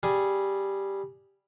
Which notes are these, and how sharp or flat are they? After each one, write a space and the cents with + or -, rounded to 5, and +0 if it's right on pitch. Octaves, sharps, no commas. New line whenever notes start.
G3 +0 G#4 +0